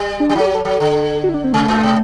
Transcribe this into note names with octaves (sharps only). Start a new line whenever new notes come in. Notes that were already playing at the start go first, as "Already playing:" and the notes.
Already playing: G3
D4
G3
F#3 E4 A4
G4
A4
F#3 A4
D3
F#4
E4
D4
C4
C3 A3
A2
B2